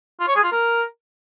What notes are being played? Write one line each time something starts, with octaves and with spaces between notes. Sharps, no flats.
F4
C#5
G#4
F4
A#4